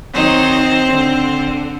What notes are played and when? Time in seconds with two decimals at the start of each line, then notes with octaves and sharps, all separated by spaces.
0.13 D#3 F#3 C4 D#4 C5
0.87 D3